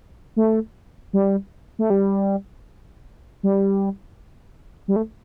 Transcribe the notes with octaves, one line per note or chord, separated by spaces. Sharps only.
A3
G3
A3
G3
G3
G3
A3